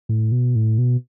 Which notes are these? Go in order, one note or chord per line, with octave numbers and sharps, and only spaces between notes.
A2
B2
A2
B2